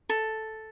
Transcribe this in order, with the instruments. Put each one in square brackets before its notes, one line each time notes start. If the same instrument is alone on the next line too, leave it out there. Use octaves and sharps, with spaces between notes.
[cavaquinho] A4